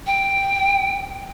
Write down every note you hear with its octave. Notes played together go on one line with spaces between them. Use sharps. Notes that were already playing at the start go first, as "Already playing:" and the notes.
G5